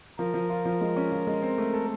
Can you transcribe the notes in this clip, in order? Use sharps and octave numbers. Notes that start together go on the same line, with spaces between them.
F3 A#4
F3
F4
F3
G#3
C#4
F3
G#3
C4
A3
A4